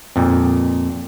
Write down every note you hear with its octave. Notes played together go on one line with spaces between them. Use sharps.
F2 A#2